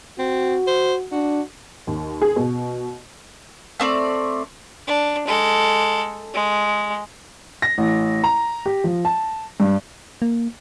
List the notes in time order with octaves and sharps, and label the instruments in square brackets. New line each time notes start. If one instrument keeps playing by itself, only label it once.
[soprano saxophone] C4 [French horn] F#4
[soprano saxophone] C5
[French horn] D4 [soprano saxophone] F#4
[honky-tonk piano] D#2
G#4
B2
[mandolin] A3 C4 D5
[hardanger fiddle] D4
G#3 A4
G#3
[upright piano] A#6
A1
A#5
G4
F3
A5
G2
[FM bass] A#3